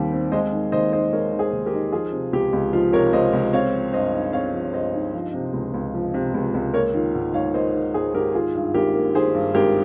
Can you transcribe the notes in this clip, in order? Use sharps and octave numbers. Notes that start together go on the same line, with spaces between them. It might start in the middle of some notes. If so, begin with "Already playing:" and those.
Already playing: D#2 D#3 G3 C4
C4
G#3 C5 D#5
D#3
D#2 C5 D#5
D#4 C5 D#5
G#3 A#4 C#5
D#3
G#4 C5
D#2
G4 A#4
D#4
F3 F4 G#4
C3
C#2 G4
C#2
F3 F4
C3 A#4 C#5
C#2 C5 D#5
C#2
C4 C#5 F5
F3
G2 C5 D#5
D#4
C4 C#5 F5
F3
C#5
G2 C5 D#5
D#4
F3
C3
C#2
C#2
F3
C3
C#2
C#2
A#3 A#4 C#5
D#3 F4
G#2
G#2 C#5 F5
A#3 C5 D#5
D#3
G#2 G#4 C5
G#2 G4 A#4
D#3 F4 G#4
G2
G#1 G4 A#4
A#3
D#3 G#4 C5
G2
G#1 G4 A#4